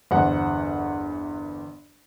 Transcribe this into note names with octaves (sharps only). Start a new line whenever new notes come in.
G1 E2 C5 F#5